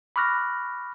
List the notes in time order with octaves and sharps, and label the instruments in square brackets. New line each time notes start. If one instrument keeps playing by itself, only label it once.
[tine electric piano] B5 C#6 D6 F6 F#6 A#6